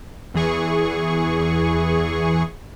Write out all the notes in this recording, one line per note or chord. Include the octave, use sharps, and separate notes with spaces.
E2 E3 G#4 C#6